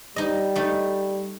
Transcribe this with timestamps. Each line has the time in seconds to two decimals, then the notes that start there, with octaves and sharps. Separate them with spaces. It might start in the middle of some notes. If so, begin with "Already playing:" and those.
0.16 G3 D#4 D#5
0.56 A3 D#4